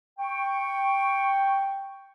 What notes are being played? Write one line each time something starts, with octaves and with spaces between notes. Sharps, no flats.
G5 C#6